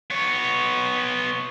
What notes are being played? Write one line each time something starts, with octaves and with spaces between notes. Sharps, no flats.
B3 C#5